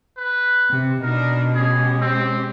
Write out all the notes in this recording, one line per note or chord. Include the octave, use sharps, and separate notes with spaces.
B4
C3
B2 D4 D#4 A#4
G#3 C#4 G4 G#4
C4